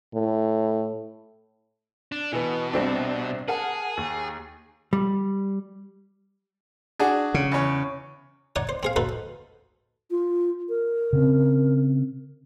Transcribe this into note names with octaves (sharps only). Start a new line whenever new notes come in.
A2
D4
B2 E3 B3
C2 C4 D4
G#4 A#4 F#5 A5
D#2
G3
D4 F#4 G#4
C#3
E2 C#5
D#4 C#5 D5 F#5
C5
C4 G#4 F5
D#4 F#4 A4 B4 C5
F4
A#4
C#3 C4